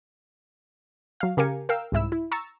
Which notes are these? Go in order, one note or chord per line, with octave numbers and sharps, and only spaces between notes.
F#3 F5
C#3 G4 A#4 F5 G#5 C#7
A#4 F5 G5 E6
C2 G#2 E4 E6
E4
A#5 C#6 E6 A6